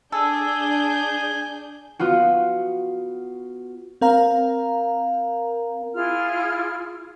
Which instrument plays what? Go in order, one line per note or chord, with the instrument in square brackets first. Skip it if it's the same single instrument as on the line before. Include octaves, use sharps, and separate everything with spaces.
[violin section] D4 G6 [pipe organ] G#4 [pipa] A4 [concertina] G#5
[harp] B3 F4 F#4
[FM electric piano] C4 A#4 F5 A#5
[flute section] E4 F4 G#4 F6